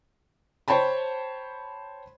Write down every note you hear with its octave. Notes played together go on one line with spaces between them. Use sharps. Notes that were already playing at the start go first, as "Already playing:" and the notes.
C5 C#5 G5 A5 B5